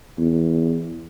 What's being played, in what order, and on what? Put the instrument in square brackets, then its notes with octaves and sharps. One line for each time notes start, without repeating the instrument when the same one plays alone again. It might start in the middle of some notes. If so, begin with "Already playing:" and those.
[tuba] E2